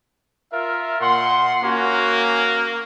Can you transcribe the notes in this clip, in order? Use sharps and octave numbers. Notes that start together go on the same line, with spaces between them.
F4 A#4 E5
A#2 F#5 C6
A#3 C#4 F#4